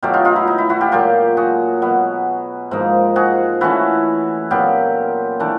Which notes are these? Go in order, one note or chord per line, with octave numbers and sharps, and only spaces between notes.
B2 F#3 A3 F4 G4
D#4 F4
D#4 F4
E4
D#4
E4
E4 F#4
F4 G4
A#2 F#3 A#3 F4 G4
F#4 G#4
B2 F#3 B3
G#2 F3 A#3 D#4
F#4 G#4
E3 A3 C#4 E4 F#4
A#2 F#3 B3 F4 G4
E3 A3 D4